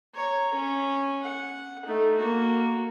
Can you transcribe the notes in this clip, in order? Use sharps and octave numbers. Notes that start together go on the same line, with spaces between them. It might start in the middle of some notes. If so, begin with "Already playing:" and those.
C#5 A#5
C#4
F#5
A3 D#4
A#3 F#4